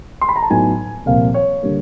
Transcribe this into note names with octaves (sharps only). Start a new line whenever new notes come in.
C6
B5
A#5
A5
A2 F#3 B3 D#4 G#5
C2 A#2 F3 A#3 F5
C#5
D3 G3 A#3